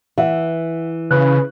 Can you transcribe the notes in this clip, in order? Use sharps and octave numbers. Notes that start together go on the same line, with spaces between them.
E3 E5 F#5
C#3 B4 F#6